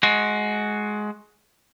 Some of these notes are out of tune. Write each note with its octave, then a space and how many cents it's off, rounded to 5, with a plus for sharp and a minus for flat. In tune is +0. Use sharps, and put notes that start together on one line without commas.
G#3 +15 F#4 +0